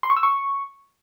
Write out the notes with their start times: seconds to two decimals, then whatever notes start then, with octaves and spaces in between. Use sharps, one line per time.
0.03 C6
0.10 C#6
0.17 E6
0.23 C#6